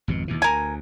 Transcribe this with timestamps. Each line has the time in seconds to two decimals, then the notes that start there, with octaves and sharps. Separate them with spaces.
0.08 G#1 F2 B2
0.28 D#2 B2 E3
0.42 D2 A#4 G#5